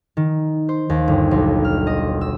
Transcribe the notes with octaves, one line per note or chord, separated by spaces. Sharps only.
D#3
C5
D#2
G1
B1
F6
D#5
E6